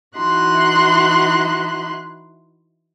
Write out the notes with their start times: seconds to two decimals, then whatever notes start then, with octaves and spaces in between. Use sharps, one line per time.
0.18 E3 D#4 E4 F#4 C6 F#6